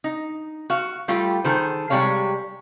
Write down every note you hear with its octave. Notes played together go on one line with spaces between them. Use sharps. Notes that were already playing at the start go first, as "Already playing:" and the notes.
D#4
F#4 F5
G3 A3 F4 G4
D#3 G#4 A4 C5
C3 G3 G#3 C#5 F5